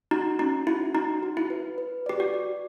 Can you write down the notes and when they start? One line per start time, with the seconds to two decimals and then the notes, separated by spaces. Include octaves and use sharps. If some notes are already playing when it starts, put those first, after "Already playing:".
0.11 D#4 F#4
0.39 C#4 D#4
0.67 E4 F#4
0.95 D#4 F#4
1.23 F#4
1.37 E4
1.50 B4
1.78 B4
2.06 G4 D5
2.20 F#4
2.34 D5